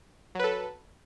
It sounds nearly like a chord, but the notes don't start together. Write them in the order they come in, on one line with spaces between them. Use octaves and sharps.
F#3 B4 A4